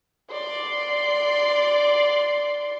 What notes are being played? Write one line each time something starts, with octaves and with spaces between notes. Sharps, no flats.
D5 C6